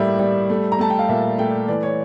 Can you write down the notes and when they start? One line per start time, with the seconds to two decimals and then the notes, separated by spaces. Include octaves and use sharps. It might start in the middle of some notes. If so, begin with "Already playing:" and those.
Already playing: A2 G3 A#3 D5 E5
0.19 G3
0.50 A3
0.72 A#5
0.79 A3 A5
0.90 G5
0.99 F5
1.09 A#2 E5
1.38 A3 G5
1.68 E3 D5
1.83 C#5